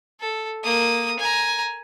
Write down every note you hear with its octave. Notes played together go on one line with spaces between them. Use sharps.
A4
A#3 D#6
G#5 A#5